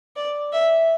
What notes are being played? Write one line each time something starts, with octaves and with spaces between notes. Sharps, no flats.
D5
E5